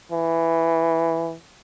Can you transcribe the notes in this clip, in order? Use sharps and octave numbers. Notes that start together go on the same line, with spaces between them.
E3